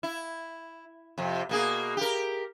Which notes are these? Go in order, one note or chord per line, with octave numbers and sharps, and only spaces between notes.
E4
F2 C3
B2 A#3 G#4
G4 A#4